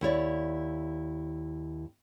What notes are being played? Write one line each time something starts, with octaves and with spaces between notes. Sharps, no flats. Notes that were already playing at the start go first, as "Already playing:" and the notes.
D#2 E4 C#5 D5